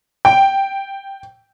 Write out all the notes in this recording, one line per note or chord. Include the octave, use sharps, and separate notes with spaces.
G5